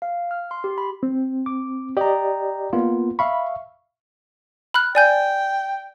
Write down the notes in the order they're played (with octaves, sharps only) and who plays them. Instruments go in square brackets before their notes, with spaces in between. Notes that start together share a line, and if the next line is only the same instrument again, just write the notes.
[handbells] F5
F6
C6
G4
B5
[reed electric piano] C4
[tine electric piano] D6
[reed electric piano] G4 D5 D#5 [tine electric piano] G5 A#5
[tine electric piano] A#3 B3 F4
[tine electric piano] E5 F5 C#6 [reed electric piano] B5
[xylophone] B5 F6 F#6
[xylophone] D5 G#5 G6 [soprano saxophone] G5